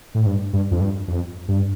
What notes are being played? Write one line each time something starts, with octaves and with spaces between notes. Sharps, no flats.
A2
G2
G2
F2
G2
F2
G2